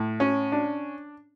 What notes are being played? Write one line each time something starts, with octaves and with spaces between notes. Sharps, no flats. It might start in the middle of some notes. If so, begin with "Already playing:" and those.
Already playing: A2
C#4
D4